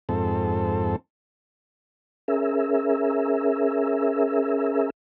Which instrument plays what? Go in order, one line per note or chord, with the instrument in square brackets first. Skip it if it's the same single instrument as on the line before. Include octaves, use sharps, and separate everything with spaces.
[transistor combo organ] F2 G#2 C4 A4
[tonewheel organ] C#4 G#4 A#4 E5